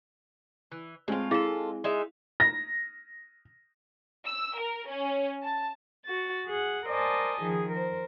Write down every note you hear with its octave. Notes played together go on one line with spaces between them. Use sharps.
E3
A2 G#3 C4 F4
E4 F4 G#4 A4 F5
G#3 D#4 E5
A#6
E6
A#4
C#4
A5
F#4 A6
G#4 F#5
A#4 C5 D5 D#5 G#5 A5
D#3 F3 G#4
A#4 C5